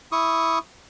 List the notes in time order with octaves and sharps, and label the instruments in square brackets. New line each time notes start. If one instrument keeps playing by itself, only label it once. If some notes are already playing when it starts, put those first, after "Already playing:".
[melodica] E4 C#6 D#6